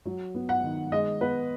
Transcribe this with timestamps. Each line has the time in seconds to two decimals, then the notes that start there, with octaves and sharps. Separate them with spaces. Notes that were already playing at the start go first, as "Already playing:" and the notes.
0.06 F#3
0.35 B3
0.49 F#5
0.63 D#3
0.92 G#3 D#5
1.21 B3 B4